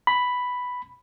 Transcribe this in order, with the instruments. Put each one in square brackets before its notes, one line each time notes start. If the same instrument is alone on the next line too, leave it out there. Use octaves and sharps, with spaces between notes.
[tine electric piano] B5